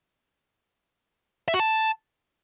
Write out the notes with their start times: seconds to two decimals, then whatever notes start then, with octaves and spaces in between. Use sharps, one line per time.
1.48 E5
1.54 F#4
1.60 A5